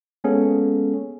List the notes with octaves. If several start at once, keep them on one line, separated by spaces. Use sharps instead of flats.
G#3 A#3 B3 C#4 G#4 A4